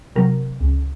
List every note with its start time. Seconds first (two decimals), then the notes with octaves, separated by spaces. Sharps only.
0.16 C3 F#3 A#4
0.60 C#2